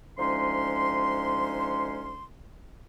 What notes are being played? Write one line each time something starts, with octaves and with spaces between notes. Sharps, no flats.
D2 F3 G#3 C#4 D#4 C6